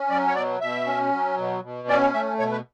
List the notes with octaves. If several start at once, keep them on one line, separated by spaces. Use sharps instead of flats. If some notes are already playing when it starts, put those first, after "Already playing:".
Already playing: C#4
F#3 D5
C#5
B2 D5
B2 E5
C#4
F#3
B2
B2
C#4 D5
A3 E5
B2 C#5
B4